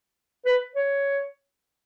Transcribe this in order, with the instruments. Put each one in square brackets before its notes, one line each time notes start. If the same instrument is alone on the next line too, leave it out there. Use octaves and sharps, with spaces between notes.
[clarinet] B4
C#5